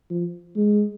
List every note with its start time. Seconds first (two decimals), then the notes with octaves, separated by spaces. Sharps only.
0.11 F3
0.56 G#3